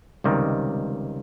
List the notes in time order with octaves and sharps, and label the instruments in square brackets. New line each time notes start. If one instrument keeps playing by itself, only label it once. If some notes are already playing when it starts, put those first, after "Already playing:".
[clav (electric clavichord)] C#2 C3 D#3 G3